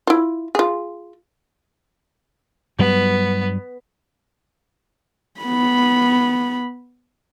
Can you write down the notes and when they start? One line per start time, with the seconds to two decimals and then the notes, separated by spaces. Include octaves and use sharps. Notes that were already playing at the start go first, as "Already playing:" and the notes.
0.07 E4 F4
0.55 F4 G#4
2.79 G2 F#3 G3 B3
5.40 B3 B5